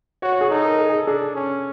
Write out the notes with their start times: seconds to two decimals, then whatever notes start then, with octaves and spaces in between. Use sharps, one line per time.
0.22 F#4 C#5
0.32 C#5
0.41 G#4
0.50 D#4 A4
0.65 A#4
0.79 G#4
0.89 G#4
0.98 A4
1.07 D4 G#4
1.35 C#4